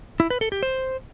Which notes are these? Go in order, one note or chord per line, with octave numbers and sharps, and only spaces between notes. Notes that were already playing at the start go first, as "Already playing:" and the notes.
E4
B4
A4
G4
C5